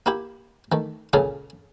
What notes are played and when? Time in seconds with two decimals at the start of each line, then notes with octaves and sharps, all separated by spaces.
0.06 A#3 E4 G4
0.72 D#3 A3
1.13 C#2 A#2 C#3 G#4 A4 F5